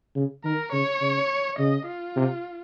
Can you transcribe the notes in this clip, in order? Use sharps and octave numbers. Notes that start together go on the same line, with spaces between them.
C#3
D#3 A#4
C#3 C#5
C#3
C#3 D#5
F4
C3